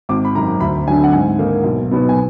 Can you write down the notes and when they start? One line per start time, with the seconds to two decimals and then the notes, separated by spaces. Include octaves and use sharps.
0.09 G#1 D6
0.25 B5
0.35 F#2 D#3 A#5
0.60 D2 B5
0.87 D3 F#3 D4 G#5
1.04 F#5
1.12 G#2 G#5
1.39 D#3 A#3 D#4
1.64 B1
1.91 B2 F#3 B3 D#4
2.09 G#5